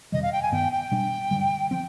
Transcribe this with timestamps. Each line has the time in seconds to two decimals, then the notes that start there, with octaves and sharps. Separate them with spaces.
0.12 F2 C3 D#3 G3 D#5
0.22 F5
0.32 G5
0.42 G#5
0.52 G2 D#3 B3 G5
0.72 G5
0.92 B2 G3 D4
1.31 G2 D3 G3
1.71 F3 C4 G5